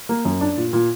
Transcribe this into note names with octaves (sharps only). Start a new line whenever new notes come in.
A#3
F#2
D4
A#2
A#2